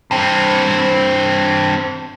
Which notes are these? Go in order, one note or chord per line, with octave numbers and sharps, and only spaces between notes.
G2 C4